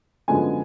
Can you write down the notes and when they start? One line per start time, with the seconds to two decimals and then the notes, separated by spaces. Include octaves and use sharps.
0.28 F#2 D3 F3 G#3 B3 G#5